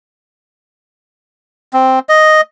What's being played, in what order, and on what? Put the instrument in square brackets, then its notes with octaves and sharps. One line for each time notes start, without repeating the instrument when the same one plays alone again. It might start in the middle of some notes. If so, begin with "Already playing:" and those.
[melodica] C4
D#5